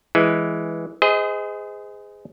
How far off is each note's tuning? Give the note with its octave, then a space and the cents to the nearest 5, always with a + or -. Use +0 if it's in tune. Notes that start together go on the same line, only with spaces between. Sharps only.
E3 +0 G#3 +0
G#4 -10 C5 -40 D#5 +15